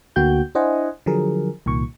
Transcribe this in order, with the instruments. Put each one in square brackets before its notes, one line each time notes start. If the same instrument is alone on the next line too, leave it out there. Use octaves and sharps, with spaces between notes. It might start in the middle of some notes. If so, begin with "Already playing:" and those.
[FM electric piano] D2 D3 A#3 F#4 G5 G6
D4 E4 C5 D#5 F#5 G#5
D3 F3 F#3 G#4 A#4
C2 A#2 D#3 C#6